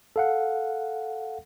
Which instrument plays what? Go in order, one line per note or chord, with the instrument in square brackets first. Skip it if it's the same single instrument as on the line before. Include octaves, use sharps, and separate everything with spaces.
[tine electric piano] A4 F5 F#5